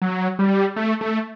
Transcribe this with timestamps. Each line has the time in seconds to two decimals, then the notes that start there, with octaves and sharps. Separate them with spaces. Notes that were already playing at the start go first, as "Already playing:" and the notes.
0.02 F#3
0.39 G3
0.76 A3
1.01 A3